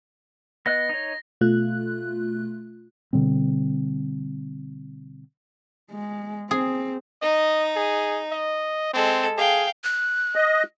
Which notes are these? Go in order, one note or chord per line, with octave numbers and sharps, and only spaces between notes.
B3 D#5 F#6 A#6
D#4 C#5
B2 A3 F4 F#6
B2 D3 G3 C4
G#3
C4 G#4
D#4 D#5
G#4
D#5
G#3 C4 A4
G#4 F5 G5
F#6
D#5